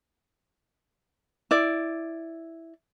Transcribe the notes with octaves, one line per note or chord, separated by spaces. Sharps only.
E4 D5